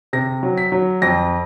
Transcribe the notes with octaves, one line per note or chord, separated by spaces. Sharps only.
C3 A#6
F#3
B6
F#3
F2 A#6